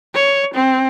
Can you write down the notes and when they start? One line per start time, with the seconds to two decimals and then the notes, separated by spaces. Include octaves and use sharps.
0.15 C#5
0.54 C4